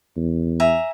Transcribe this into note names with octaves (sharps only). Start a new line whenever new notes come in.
E2
E5 G#5 A#5